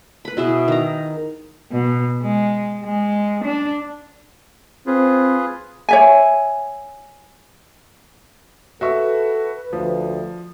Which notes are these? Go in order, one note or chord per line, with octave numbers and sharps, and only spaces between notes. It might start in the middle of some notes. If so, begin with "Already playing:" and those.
B4 B5
B2 E4 G#4 E5
D#3 A#5
B2
G#3
G#3
D4
C4 F4 G#4 B4
C#5 E5 G#5
F#4 A4 B4 E5 C#6
D2 F3